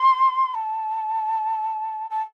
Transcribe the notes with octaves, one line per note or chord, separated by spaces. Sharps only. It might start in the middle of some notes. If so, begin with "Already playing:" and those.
Already playing: C6
A5
A5